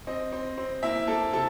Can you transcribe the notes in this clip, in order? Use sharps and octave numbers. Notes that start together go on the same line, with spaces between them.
C4 D#5
C4
C4
A#3 E4 E5
A#3 A4 A5
C3 A4 A5